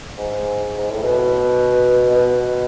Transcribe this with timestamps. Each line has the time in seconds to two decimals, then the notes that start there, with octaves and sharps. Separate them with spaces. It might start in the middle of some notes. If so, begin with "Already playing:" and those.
0.18 G#2
0.78 G#2
0.90 A2
1.02 B2
2.11 B2